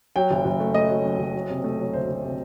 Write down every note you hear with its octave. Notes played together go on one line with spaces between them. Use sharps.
F#3 G5
F#1
F#1
A3
A3 D#5
F#3
F#2
F#1
F#3
C3
A3
F#3
D2 C5
F#3
C3